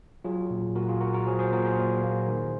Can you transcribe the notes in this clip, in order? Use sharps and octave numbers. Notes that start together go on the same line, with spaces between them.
F#3 F4 G#4
A#2
A#2 F#4 A#4
F4 G#4
A#3 F#4 A#4
F#4 A#4
F#3 G#4 C5
G#4 C5
A#2 F#4 A#4
G#4 C5
A#2
A#3
D#3